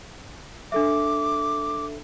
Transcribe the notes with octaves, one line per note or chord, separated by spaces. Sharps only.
D4 A4 E5 D6